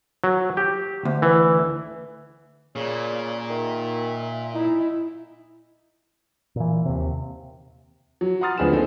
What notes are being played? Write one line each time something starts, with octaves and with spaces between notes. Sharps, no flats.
F#3
G4
D2
E3
A#2 C#3 D5
D#3 E5
D#4 E4
A#2 E3
D#2 C3
F#3
F#5 A#5 C6 D#6 F6 A6
D1 D2 F3 G#4 B4 E7
A#3 C4 D#4 G#4 A4